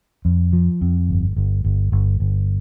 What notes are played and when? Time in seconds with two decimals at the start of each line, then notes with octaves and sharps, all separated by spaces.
0.25 F2
0.53 F3
0.81 F2
1.09 G1
1.36 G1
1.64 G1
1.92 G1
2.20 G1